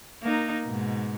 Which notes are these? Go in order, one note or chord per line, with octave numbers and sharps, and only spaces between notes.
A#3 D#4
G#2 B2